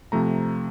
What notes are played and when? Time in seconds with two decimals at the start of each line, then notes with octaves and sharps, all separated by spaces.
0.12 C3 F3 A3 A#5